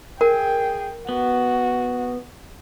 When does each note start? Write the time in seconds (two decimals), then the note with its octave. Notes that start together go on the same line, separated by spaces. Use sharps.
0.21 G#4 A#4 G5
1.09 B3 F#4